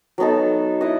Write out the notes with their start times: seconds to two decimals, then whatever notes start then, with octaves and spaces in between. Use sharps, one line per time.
0.18 F#3 B3 D#4 A4
0.81 E4 B4 D#5